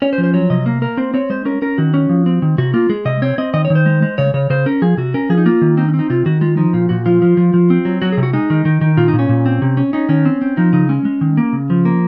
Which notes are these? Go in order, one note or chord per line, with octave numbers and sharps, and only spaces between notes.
C#4 C#5
C5
F3
C5
F#3 C#5
C3 D#5
A#3
A#3 A#4
C4 C5
C4 C#5
G#3 C5
C#4 A#4
C#4 A#4
D#3 F#4
C#4
F3
C4
D#3
C3 F#4
A#3 F4
G#3 G#4
C3 D#5
C4 C#5
C4 D#5
D#3 D#5
C#5
D#3
C5
G#3
G#3
C#3 C#5
C#3 C#5
C#3 C5
C#4 A#4
F3 G#4
C3 F#4
C#4 A#4
F3 G#4
D#4
A#3 F4
D#3
C4 D#4
C#4
C4
D#4
C3 F4
D#3 F#4
G#3 F4
F3 D#4
A#2 F4
A#2 F#4
F3 F4
F3
F3
F3
C4
F#3
F#3 F#4
G#4
C3
F#4
G#3 D#4
D#3
D#3
D#3
A#2 F4
D#4
A#2
C#4
A#2
C4
C3
C#4
C#4 D#4
D#3 C#4
C4
C4
F3 D#4
C#3 D#4
G#3 C#4
G#3
D#3
A#3
C#3
F3
A#3